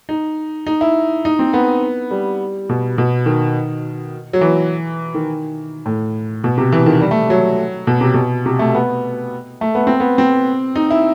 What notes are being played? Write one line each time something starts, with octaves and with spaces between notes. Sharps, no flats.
D#4
D#4
E4
D#4
C4
B3
G3
B2
B2
D#3
F#3
E3
D#3
A2
B2
C3
E3
D#3
G3
A3
F#3
B2
C3
B2
C3
A3
B3
A3
B3
C4
B3
C4
D#4
E4